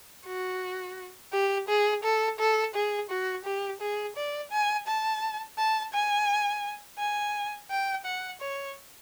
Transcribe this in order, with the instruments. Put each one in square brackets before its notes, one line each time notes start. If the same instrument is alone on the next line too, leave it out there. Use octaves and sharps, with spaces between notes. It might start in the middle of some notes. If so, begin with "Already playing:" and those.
[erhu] F#4
G4
G#4
A4
A4
G#4
F#4
G4
G#4
D5
G#5
A5
A5
G#5
G#5
G5
F#5
C#5